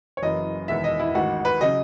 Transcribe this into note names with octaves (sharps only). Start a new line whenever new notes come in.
C#5
F#1 F#2 E3 D#5
E1 E2 D#3 E5
D#5
E4
A1 G#2 D#3 F#4
B4
C#3 F#3 D#5